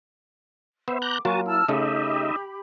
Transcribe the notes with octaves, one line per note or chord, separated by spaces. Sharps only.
B3 C5 E5
A#5 D6 F#6 G6
F#3 A#3 F4 F#4 G#5 A5 C#6
E4 A5 E6 F6
C#3 A3 D#4 G4 D#5 E5 B5